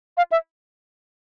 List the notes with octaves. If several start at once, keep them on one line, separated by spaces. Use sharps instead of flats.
F5
E5